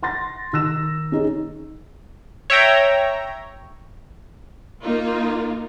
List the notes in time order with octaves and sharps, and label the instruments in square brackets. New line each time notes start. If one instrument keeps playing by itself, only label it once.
[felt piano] F#5 C6 A6 A#6
D#3 E6 A#6 E7
C#4 D#4 G#4
[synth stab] C#5 E5 G5 A#5
[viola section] A#3 D#4 F4